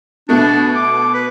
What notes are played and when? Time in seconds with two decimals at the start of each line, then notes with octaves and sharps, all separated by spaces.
0.29 B2 A3 B3 D4
0.76 D6
1.14 B4